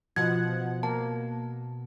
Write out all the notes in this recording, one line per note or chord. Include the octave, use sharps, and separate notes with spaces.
B2 F3 F#5 G#6
A#3 A5